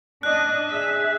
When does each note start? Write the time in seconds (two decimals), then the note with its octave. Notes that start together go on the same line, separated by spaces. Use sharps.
0.23 D4 D#5 F#6
0.70 G#4 E5